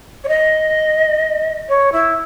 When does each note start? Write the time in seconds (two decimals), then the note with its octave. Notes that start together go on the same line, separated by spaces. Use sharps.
0.24 C#5
0.28 D#5
1.68 C#5
1.92 E4